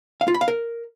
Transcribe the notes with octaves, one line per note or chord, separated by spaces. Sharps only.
F5
F4
B5
F5
A#4